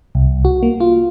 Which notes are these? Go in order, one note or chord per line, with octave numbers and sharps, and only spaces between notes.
C2
F#4
A#3
F4